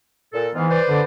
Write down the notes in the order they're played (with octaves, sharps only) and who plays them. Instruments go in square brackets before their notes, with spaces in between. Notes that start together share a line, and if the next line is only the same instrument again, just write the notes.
[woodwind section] A#2 A4
[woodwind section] G#2 B3 F4 [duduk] E3
[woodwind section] B4 C5 D5
[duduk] D3